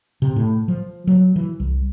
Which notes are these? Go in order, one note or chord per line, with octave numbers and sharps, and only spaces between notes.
C3
A2
F3
F#3
E3
C2